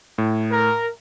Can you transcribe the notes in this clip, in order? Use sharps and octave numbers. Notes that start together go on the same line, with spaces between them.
A2
A#4